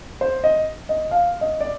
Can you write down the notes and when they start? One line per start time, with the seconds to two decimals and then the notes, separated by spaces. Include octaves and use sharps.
0.21 C5
0.44 D#5
0.89 D#5
1.11 F5
1.41 D#5
1.60 D5